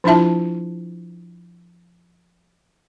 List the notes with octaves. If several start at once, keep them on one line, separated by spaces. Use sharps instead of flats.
F3 D4 E4 F4 E5 A5